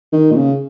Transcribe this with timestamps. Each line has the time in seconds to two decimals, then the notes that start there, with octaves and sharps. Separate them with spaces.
0.13 D#3
0.31 A#2
0.36 C#3